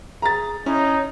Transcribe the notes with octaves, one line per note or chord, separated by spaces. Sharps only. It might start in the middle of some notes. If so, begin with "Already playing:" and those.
G#4 A#5 A6
C#4 D#4 E4 C#5